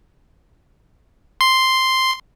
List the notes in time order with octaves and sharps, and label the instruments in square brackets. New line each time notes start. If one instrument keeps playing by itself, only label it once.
[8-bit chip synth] C6